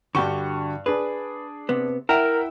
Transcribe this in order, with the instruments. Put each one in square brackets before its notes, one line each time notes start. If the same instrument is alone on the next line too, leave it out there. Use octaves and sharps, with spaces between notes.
[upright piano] G2 C#6 [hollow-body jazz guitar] D3 F#4 G4
[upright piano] D4 G#4 [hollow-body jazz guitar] B4
[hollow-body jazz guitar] C3 B3
[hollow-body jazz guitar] E4 [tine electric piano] A#4 A#5 [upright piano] E5 F#5 G5